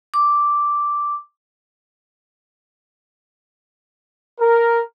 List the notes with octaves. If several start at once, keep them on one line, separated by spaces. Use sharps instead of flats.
D6
A#4